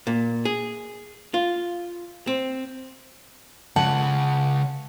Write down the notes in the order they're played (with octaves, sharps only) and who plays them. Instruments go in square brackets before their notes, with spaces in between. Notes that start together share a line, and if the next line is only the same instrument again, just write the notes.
[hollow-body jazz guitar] A#2
G#4
F4
C4
[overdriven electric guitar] C#2 C#3 [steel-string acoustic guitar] F#5 [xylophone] A5